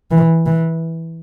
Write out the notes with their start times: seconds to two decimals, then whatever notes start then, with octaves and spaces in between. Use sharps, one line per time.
0.11 E3
0.46 E3